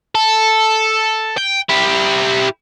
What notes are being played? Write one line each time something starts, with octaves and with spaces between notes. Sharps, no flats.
A4
G5
E4 G4